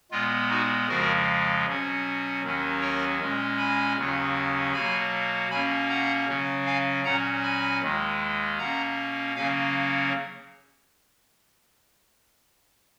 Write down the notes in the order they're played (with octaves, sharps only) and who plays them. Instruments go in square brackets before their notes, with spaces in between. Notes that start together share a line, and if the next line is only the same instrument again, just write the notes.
[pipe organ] A#2 G#3 B3 F4
D#4 F#4
F2 C#3 F3 G#3 F#4 A#4
B2 F#3 C#4
D#2 D#3 F#3 C#4
A#4 C#5
A#2 G#3 C#4
G#5 B5
D#2 C#3 F#3 C#4
B2 F#3 A#3 G#5 B5
B2 A#3 C#4 G#5 B5
F#5 A#5
C#3 F#3 C#4
F5 G#5
A#2 F#3 C#4 F#5 A#5
G#5 B5
D#2 D#3 G#3
B2 A#3 C#4 F#5 A#5
C#3 F#3 A#3 C#4 F5 G#5